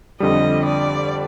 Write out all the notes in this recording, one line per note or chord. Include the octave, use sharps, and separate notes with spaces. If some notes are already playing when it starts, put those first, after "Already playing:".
F2 D3 G3 D#5
D5